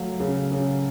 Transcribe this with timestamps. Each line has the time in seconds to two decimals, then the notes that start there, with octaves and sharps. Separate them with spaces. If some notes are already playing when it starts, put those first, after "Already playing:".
Already playing: F#3 A3 F5
0.20 C#3
0.52 C#3